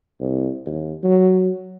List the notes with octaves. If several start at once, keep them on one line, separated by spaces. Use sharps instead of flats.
C2
D#2
F#3